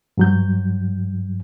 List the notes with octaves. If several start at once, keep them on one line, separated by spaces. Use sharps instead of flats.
G2 F#3 G6